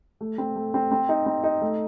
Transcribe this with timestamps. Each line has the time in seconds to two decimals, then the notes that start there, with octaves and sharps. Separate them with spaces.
0.21 A3
0.38 C4
0.56 A3
0.74 C4
0.92 C4
1.09 D#4
1.26 C4
1.44 D#4
1.61 A3